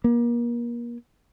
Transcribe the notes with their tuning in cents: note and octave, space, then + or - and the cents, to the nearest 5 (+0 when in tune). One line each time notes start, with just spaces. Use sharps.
A#3 +35